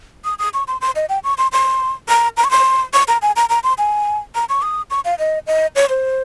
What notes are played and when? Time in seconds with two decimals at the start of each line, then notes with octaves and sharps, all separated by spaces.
0.24 D#6
0.39 D#6
0.54 C#6
0.68 C6
0.81 C6
0.96 D#5
1.09 G5
1.24 C#6
1.38 C6
1.53 C6
2.09 A#5
2.37 A#5
2.44 C#6
2.51 C6
2.93 C#6
3.08 A#5
3.22 G#5
3.36 A#5
3.49 A#5
3.64 C6
3.78 G#5
4.35 A#5
4.49 C#6
4.62 D#6
4.90 C#6
5.05 F5
5.19 D#5
5.47 D#5
5.76 C#5
5.89 C5